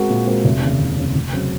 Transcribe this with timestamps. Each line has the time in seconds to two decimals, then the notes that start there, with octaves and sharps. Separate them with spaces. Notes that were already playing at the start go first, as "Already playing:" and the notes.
Already playing: G#3 C4 F#4 A#4
0.10 A#2
0.27 G#3 C4 F#4 A#4
0.44 F1
0.62 D#2 C#3
0.80 F1
0.98 D#2 C#3
1.15 F1
1.33 C#3 F#3 C4